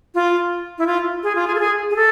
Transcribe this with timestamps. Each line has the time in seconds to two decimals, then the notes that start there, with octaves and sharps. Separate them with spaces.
0.15 F4
0.78 E4
0.87 F4
1.23 G#4
1.35 F4
1.47 G#4
1.56 A4
1.60 G#4
1.90 G#4
1.96 A4